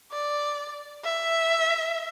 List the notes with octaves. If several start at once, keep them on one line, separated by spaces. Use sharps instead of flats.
D5
E5